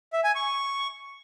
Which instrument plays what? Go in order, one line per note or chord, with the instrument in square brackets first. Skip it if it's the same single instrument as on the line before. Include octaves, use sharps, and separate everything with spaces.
[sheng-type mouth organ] E5
G#5
C#6